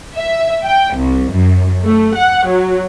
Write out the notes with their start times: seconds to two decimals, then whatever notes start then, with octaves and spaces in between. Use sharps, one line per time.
0.16 E5
0.64 G5
0.96 C2
1.32 F#2
1.84 A3
2.16 F#5
2.48 F#3